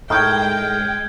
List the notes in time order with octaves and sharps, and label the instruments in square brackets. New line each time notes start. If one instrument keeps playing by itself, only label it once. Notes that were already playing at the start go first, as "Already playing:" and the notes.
[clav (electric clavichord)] A2 D#4 A#4 [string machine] G#3 [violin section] G5 [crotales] F6 G6 G#6